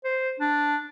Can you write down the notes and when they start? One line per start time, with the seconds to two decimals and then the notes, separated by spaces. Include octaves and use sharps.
0.04 C5
0.40 D4